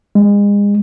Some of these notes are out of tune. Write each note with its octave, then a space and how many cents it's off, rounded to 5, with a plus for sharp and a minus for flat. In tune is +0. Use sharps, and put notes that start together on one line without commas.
G#3 -35